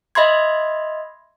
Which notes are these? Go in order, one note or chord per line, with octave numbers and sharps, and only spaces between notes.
D#5 E5 B5 C6 G#6